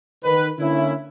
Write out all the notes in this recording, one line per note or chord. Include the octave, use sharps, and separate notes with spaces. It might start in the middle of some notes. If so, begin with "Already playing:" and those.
D#3 B4
D3 A#3 C#4 E4